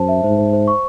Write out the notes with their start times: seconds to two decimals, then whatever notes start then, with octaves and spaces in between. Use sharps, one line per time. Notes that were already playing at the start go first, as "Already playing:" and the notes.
Already playing: F#2 C5 A5
0.08 E5
0.23 G#2 C5
0.38 C5
0.53 C5
0.68 C#6